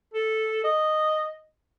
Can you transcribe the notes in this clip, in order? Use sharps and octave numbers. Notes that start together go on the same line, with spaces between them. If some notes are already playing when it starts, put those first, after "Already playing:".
A4
D#5